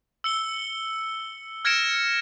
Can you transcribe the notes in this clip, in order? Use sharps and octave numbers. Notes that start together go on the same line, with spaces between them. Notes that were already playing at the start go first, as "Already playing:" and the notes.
E6 C#7 G7
F6 G#6 A#6 C#7 D7 E7